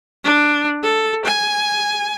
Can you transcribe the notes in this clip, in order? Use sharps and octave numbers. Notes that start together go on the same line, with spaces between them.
D4
A4
G#5